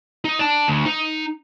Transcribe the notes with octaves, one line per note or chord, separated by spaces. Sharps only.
D#4
D5 A5
D2
D#4